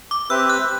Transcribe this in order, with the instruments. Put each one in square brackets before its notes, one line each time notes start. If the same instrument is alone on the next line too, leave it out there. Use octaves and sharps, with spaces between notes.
[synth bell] D6
[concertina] C4 G4 B4 E5 [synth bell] E6
[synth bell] F#6